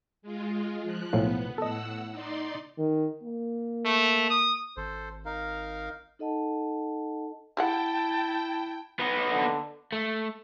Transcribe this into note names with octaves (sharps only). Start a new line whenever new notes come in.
G#3 F4
F3 F#6
B1 A2 F3 B3
A2 A4 D#5 F#5 E6
D#4 D5 C6
D#3
A#3
A3
D#6
G#1 A4 C5
D#4 A#4 F5
D#4 A4 D#5 F#5 A5
E4 G4 G#4 F#5 G5 A5
B3 D#4
D3
A3